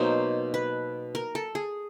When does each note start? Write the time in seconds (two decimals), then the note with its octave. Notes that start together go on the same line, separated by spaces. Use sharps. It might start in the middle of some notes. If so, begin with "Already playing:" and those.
Already playing: B2 F#3 A#3 D#4 C5
0.54 B4
1.15 A#4
1.35 A4
1.55 G#4